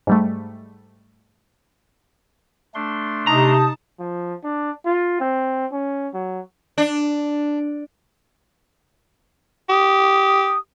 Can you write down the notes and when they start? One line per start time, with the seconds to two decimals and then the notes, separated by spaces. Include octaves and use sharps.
0.07 G#2 G3 A3
2.75 A3 D4 C6
3.27 C3 D#4 A5 A#5 D#6
3.99 F3
4.44 D4
4.85 F4
5.20 C4
5.71 C#4
6.14 F#3
6.78 D4
9.69 G4 D#6